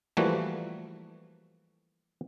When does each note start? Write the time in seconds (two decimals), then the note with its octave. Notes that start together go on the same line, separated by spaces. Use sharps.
0.17 E3 F3 G3 A3 A#3 F#4